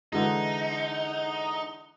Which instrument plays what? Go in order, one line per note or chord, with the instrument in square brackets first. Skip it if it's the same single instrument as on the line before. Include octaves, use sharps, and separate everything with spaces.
[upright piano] D3 E3 G#3 [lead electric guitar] D#4